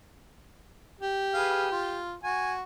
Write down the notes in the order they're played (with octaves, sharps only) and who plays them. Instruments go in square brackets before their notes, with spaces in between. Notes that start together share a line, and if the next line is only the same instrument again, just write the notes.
[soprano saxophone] G4
[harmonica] G#4 B4 F5
F4
[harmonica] F#4 [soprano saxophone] G#5